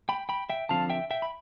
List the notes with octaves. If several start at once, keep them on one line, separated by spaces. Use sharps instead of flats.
G5 B5
G5 B5
E5 G5
D3 F3 C4 F5 A5
E5 G5
E5 G5
B5